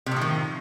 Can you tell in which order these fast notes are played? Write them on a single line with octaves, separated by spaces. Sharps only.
C3 A2 F3 D#3